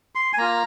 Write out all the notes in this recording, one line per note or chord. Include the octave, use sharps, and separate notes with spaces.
C6
G#5
A#3 F4 A#5